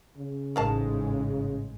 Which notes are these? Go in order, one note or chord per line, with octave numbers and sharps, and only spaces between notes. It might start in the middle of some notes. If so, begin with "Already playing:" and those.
C#3
A1 G#2 G#3 A#4 F5 A5